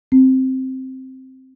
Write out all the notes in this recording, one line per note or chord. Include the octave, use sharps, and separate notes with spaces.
C4